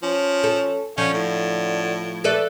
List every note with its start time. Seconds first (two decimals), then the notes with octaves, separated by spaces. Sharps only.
0.03 F3 C#4
0.44 A4
0.98 D3 F3 C#4
1.14 A2
2.24 A3 A4 B4 D5